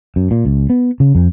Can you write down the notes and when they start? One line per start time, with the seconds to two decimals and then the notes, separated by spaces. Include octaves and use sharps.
0.16 F#2
0.31 A#2
0.45 C#2
0.70 B3
1.00 C#3
1.15 F2